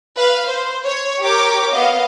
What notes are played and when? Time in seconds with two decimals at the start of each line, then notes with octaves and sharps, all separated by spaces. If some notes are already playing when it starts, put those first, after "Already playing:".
0.15 B4 F5
0.49 C5
0.85 C#5
1.21 G4 A#4 C#5 D6
1.73 B3 D#5 F5